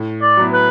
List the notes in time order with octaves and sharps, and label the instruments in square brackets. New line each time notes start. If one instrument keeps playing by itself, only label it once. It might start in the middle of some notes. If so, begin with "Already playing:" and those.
Already playing: [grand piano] A2
[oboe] D5
[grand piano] F#3 B3 E4
[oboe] B4